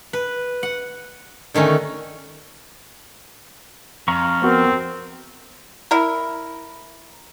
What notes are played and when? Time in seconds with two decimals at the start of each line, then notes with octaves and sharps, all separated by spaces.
0.13 B4
0.63 F#5
1.54 D3 D#3 A3 C#4
4.08 F2 F5 A#5 C#6
4.42 B3 C4 F#4 A#4
5.91 E4 A#4